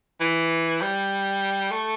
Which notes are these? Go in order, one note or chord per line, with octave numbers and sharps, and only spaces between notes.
E3
G3
A3